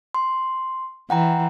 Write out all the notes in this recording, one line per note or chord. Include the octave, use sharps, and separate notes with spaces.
C6
E3 F#5 G5 A#5